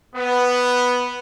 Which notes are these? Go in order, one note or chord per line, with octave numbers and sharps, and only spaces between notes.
B3